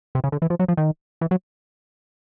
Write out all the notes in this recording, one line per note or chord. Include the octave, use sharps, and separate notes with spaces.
C3
C#3
D3
E3
F3
F#3
F3
D#3
E3
F#3